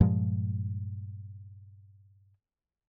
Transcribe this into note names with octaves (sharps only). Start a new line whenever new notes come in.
G2 A#2 F3 G#3